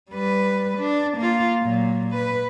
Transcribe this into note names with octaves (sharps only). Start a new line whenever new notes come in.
G3 B4
D4
A#3 F4
A#2 F#3
B4